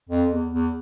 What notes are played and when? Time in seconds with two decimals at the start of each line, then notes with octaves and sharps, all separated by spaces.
0.09 F2
0.31 E2
0.52 E2